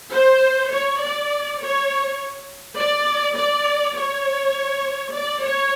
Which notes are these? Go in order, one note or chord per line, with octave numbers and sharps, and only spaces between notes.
C5
C#5
D5
C#5
D5
D5
C#5
D5
C#5